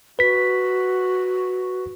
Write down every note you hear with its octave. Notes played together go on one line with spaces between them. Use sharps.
F#4 B4 B6